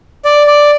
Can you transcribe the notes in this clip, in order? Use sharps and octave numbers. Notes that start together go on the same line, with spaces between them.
D5
D5